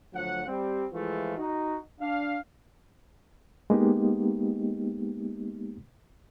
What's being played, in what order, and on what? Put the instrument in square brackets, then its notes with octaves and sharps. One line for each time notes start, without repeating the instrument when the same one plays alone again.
[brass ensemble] D2 F3 F#3 F#5
G3 C4
E3 F3 G#3 A3 F4
D#4 F#4
D4 F5
[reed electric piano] G#3 A#3 B3 D#4 G4